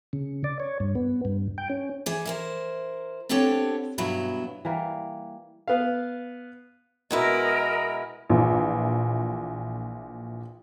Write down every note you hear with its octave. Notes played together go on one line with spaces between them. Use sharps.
C#3
D5
C#5
G2
B3
G2
G5
C#4
E3 G#4 D5
E4 A#4 C5
B3 C4 D4 G4 A4 C#5
G2 B2 F#3 B3 E4
E3 G3 A#3
B3 F5
B2 G#3 E4 A#4 D#5
A#1 A#2 E3